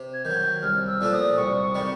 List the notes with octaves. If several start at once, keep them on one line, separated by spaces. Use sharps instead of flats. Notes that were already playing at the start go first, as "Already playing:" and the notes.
Already playing: C3
G#6
D#3 F#3 G6
C2 F6
E6
A#2 F3 A3 D4
D#6
C2 C#6
C3 D#3 G3